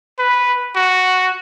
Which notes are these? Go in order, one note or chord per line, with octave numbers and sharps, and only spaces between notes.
B4
F#4